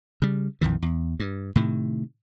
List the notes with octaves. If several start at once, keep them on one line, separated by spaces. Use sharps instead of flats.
C#3 G3
A#1 F2 D#3 E3
E2
G2
A2 C3 D#3